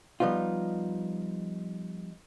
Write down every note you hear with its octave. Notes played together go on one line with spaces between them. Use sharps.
F3 G3 B3 D#4 F4